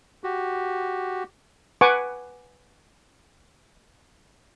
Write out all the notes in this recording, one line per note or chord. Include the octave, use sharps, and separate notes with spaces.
F#4 G4
B4 F#5 G#5 C#6 D6